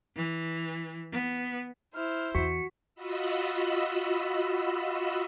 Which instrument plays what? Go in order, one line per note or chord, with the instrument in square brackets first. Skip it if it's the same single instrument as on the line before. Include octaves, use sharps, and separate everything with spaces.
[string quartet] E3
B3
[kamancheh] E4 C5 [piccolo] F6
[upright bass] E2 [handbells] F#4 [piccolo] C#7
[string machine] F4 F#4 D#5 B5 E6